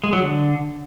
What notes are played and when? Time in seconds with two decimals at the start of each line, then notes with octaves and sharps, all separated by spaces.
0.04 G#3
0.13 F#3
0.22 D3